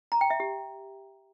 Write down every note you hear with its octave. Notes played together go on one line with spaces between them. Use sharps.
A#5
G5
E5
G4